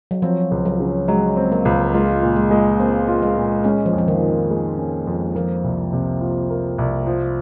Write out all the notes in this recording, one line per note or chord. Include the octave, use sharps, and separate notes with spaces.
F#3
F3 C4
C#2
F#3
C#3
F#3 G#3
C4
A#3
C#2
G#3 F4
A#2
G#3
G#3
A#3 C4
F4
G#3
A#2
G#3 C#4
F3
F2
F3
D#3
D#3
G#3
C#4
F2
F3 A#3
C2
C3
F3
A#3
C2
F3